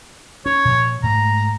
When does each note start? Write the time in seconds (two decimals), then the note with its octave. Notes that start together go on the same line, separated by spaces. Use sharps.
0.46 C#4 C#5
0.65 A#2 F3
1.03 G#2 A3 A#5